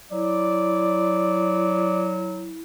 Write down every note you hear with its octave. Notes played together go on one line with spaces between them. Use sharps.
F#3 E4 D5